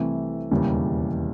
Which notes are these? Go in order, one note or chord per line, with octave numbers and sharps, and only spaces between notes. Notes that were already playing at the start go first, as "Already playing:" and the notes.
Already playing: C2 C3 E3 A3
E1 D#2 C#3 E3 G3